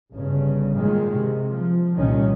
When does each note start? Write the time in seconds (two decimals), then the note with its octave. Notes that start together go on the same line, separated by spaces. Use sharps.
0.12 G1 C#3
0.74 A#2 D#3 G#3
1.14 C3
1.49 F3
1.96 C2 A#2 D#3 C#4